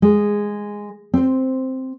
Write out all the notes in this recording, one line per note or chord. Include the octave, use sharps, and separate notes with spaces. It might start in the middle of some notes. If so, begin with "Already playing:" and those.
G#3
C4 C5